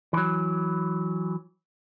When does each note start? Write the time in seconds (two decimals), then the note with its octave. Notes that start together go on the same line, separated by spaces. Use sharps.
0.13 E3 F#3